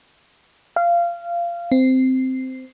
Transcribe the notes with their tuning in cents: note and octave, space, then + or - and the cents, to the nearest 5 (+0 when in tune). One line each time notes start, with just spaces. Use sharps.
F5 -20
C4 -10